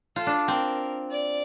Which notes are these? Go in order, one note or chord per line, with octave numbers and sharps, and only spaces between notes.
F4 A4
D4
C4 A#4
D5